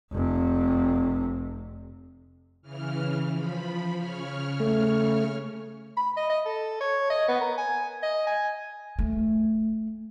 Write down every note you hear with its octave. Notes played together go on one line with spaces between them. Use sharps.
F1 C3
C#3 E3 F6
F3 B5
C#3 C#5 F6
A3
B5
D#5
D#5
A4
C#5
D#5
B3
A#4
G#5
D#5
G#5
A3